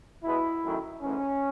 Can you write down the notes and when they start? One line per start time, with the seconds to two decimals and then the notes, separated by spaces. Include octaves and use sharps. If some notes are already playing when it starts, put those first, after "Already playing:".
0.23 B2 G#3 B3 E4
0.63 F#2 D#3 A3
1.01 G#2 E3 A3 C#4